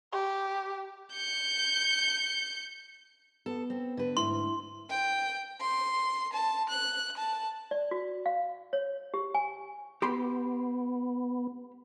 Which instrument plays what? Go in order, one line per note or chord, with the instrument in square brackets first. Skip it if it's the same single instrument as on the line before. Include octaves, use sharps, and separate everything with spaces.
[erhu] G4
[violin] G6 C#7
[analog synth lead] B3 [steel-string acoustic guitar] A4
[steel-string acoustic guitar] C4
D3 B4
[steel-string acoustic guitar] D2 G#2 [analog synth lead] E4 [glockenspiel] C6
[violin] G5
C6
A5
F#6
A5
[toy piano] D5
F#4
F5
C#5
G4
G#5
[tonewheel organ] B3 [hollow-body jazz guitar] G4 B5 C6